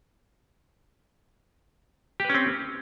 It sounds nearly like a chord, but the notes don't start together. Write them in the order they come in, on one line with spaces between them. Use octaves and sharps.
G4 B4 C#4 C4